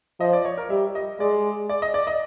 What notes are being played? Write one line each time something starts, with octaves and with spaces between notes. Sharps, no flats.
F3 D#5
D5
C#5
A#4
G3 E5
D#5
G#3 D5
D5
D#5
D5
D#5